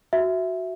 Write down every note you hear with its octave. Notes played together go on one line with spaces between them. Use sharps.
F#4 E5